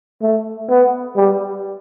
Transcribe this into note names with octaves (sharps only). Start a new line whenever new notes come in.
A3
B3
G3